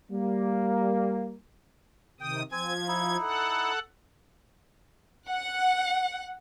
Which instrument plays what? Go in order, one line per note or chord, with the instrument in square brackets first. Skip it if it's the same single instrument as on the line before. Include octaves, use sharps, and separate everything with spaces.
[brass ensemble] G3 A#3
[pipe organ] C3 D#3 D#6 [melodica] G5
[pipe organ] F3 G#6 [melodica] C4 G#5
[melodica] D#4 E4
[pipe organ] A4 F#5
[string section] F#5